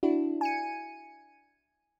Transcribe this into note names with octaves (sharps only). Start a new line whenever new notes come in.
D4 E4 F#4
G#5 C#7 D#7